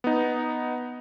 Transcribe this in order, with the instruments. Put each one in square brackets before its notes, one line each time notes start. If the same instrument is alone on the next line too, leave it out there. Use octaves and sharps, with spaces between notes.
[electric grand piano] B3 D#4